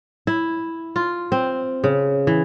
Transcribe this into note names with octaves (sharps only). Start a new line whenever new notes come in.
E4
F4
C4
C#3
E3